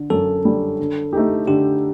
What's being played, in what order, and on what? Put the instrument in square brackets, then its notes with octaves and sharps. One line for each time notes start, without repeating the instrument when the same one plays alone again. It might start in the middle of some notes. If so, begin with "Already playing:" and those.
Already playing: [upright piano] D3
[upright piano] F#2 [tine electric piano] A4
[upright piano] D3 G3
D3
A3 D#4 G4
[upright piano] D3 [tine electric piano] G4